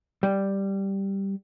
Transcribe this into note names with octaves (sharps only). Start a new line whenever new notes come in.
G3